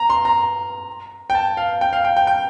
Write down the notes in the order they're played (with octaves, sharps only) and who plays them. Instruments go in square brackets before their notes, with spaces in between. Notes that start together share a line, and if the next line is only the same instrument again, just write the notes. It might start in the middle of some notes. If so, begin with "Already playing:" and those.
Already playing: [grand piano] A#5
C6
A#5
G5
A5
F5
G5
F5
G5
G5
G5